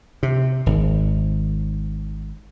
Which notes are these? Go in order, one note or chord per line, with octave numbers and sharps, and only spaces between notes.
C3
G#1